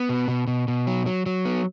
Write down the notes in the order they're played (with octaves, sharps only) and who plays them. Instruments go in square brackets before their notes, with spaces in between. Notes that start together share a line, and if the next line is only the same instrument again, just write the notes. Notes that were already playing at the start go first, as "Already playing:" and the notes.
Already playing: [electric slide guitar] B3
B2
B2
B2
B2
F#3
F#3
F#3
B3